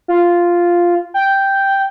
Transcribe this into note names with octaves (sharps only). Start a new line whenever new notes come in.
F4
G5